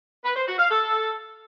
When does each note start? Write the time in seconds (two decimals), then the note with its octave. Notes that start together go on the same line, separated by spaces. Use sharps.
0.24 B4
0.36 C5
0.47 F#4
0.58 F5
0.70 A4